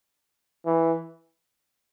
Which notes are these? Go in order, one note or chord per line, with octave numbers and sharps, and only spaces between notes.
E3